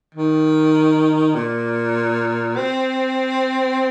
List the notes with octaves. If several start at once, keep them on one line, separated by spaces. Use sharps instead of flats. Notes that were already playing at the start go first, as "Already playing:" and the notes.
D#3
A#2
C4